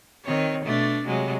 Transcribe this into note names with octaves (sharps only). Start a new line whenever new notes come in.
D#3 C4 C#5
B2 A3 D4
C3 F#3 G#3